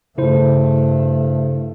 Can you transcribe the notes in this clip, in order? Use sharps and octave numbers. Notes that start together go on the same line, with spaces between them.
G2 C#3 A3 E4 C5